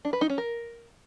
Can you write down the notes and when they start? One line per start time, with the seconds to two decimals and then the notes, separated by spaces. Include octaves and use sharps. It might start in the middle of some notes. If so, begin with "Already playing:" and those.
0.05 D4
0.13 B4
0.21 D#4
0.30 C#4
0.38 A#4